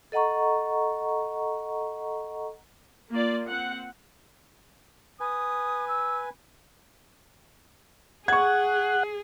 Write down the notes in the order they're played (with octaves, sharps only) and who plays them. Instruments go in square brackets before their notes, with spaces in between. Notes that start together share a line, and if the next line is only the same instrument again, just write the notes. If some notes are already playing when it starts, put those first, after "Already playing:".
[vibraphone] A4 D#5 F#5 A#5 C#6
[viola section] A#3 F4 D5
C4 F#5
[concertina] B4 G#5 [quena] D#6
[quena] E6
[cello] G#4 [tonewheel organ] F#5 [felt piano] C#6 G#6